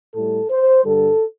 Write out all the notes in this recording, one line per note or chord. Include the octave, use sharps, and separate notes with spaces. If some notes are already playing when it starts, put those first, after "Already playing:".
A2 G3 A4
C5
G2 D3 G3 A4